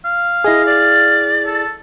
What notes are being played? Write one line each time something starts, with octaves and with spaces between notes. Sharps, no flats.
F5
E4 G#4 D#5
D5
A4